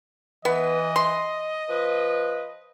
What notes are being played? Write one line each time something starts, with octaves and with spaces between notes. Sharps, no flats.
E3 B3 D#5
C6
F3 B4